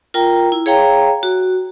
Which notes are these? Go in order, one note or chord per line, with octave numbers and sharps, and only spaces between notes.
F4 A#4 G5 A#5
E4
G#4 C#5 F5 G5 A#5
F#4